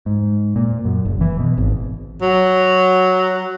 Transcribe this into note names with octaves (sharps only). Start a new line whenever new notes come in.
G#2
A#2
F#2
F#1
E3
B2
G#1
F#3